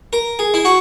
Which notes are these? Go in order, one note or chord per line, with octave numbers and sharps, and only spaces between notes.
A#4
G#4
E4
F#4